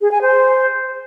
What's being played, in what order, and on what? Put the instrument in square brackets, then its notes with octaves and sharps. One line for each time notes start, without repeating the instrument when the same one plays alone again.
[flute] G#4
G#5
C5